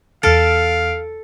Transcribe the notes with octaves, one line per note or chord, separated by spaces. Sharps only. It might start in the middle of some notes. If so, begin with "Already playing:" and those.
E2 A4 F5 F6 D7